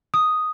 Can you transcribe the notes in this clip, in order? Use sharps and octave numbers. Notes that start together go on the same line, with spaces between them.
D#6